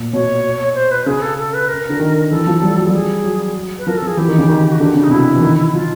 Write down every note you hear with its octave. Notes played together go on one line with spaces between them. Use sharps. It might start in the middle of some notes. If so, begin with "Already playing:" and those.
Already playing: A#2
B2 C#5
C5
B4
C#3 G#4
A4
A4
B4
A#4
D3
D#3
E3 A4
F3
G3
F#3
G3
G#4
F#3
B4
F3 A#4
A4
F3 G#4
E3 G4
D#3
C#3
D#3
F#4
D3 G4
C#3 G4
D#4
C3
B2 E4
E3
D#3
F3 F4